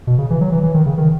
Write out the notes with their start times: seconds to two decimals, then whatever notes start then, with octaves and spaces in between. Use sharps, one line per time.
0.07 B2
0.18 C#3
0.30 E3
0.41 F#3
0.52 E3
0.63 E3
0.74 D#3
0.86 C#3
0.98 D#3